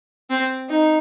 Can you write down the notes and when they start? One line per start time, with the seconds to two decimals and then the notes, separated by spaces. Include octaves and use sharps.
0.30 C4
0.69 D#4